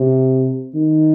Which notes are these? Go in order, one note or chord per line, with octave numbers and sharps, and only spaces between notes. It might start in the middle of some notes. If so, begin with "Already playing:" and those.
Already playing: C3
D#3